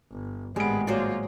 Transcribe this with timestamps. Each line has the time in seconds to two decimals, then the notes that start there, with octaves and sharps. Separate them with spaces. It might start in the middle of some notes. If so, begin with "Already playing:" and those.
0.11 G1
0.56 G#1 A2 G3 G#3 B3 G#4 D7
0.87 F#3 A#3 F4 C5 D5